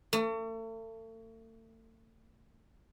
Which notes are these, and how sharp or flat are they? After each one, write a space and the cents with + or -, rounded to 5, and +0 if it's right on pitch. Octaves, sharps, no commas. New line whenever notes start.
A3 +40